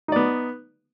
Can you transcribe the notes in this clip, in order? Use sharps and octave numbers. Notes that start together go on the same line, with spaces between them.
B3 D#4 D5